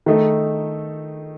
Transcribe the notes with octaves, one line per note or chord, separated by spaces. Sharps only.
D#3 A3 D#4 A4